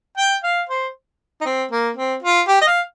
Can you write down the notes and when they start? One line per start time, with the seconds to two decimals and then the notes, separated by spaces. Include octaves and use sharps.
0.18 G5
0.44 F5
0.69 C5
1.41 D#4
1.45 C4
1.71 A#3
1.97 C4
2.23 F4
2.48 G4
2.61 D#5
2.67 F5